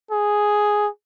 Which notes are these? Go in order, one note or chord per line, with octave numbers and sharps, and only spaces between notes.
G#4